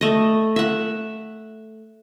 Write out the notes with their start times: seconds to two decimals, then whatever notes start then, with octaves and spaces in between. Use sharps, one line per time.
0.01 A3 D#5
0.56 E5 F#5